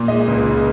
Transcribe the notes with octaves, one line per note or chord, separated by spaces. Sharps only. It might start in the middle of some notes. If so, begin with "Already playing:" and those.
Already playing: A#2
G#3 D#5
C#2
C#3